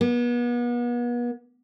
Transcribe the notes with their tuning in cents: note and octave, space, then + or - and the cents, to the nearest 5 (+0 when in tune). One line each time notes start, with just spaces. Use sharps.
B3 -40